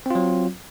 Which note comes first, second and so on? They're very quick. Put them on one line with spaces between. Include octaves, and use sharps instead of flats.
C4 F4 F#3